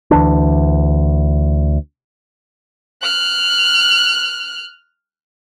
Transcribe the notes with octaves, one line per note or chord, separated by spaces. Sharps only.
D2 E3 D4
F6 F#6